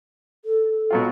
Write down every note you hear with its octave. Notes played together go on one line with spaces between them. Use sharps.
A4
B2 F#3 F4